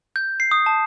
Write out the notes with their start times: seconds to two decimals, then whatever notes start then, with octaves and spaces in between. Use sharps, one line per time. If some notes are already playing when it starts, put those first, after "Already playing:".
0.16 G6
0.40 C7
0.51 D#6
0.66 A5